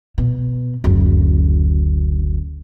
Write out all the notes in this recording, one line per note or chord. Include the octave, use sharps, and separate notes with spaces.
B2
F#1 D2